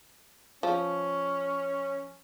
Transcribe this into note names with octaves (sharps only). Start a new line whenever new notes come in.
F3 C#4